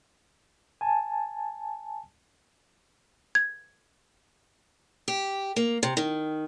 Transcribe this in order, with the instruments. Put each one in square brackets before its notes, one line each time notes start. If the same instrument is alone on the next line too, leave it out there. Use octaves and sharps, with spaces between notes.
[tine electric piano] G#5 A5
[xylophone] G#6
[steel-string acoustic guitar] G4
A#3
C3
D#3